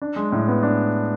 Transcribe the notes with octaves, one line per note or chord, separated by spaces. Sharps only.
D4
G#3
A2
B3
D4